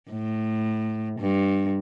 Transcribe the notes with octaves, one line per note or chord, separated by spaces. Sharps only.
A2
G2